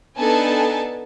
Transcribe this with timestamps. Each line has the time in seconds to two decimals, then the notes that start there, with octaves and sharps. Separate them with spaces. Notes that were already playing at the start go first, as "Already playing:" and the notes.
0.17 B3 D4 D#4 A4 G#5 A5